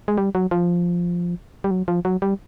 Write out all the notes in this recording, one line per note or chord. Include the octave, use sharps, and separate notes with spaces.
G#3
G3
F#3
F3
G3
F#3
F3
F#3
G3